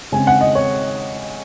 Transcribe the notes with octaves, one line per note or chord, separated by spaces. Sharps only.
C#3 G#3 C4 G#5
F#5
D#5
C#5